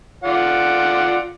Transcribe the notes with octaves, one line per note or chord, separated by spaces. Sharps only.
F4 D5 F#5